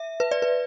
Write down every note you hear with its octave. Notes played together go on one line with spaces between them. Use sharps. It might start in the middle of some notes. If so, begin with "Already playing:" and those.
Already playing: E5
B4
D5
B4